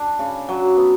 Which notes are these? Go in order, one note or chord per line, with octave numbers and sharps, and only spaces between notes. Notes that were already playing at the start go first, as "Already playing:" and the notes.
Already playing: D4
C#3
F#3
B3